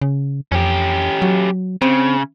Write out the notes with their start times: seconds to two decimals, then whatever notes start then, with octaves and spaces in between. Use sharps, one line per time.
0.02 C#3
0.52 F2 C#4 G4
1.22 F#3
1.82 C#3 C4